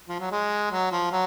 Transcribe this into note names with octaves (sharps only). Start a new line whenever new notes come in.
F3
F#3
G#3
F#3
F3
F#3